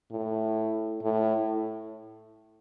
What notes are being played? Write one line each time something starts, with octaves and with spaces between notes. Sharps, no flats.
A2
A2